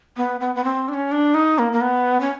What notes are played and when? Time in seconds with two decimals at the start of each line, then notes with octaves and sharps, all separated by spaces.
0.17 B3
0.40 B3
0.55 B3
0.64 C4
0.88 D4
0.93 C#4
1.12 D4
1.34 D#4
1.59 A#3
1.73 A#3
1.81 B3
2.20 C#4